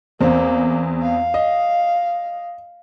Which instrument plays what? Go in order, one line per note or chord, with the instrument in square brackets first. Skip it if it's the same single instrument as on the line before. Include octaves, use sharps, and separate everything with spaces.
[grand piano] E2 C4 [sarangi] A#3
[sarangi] F5
[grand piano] D#5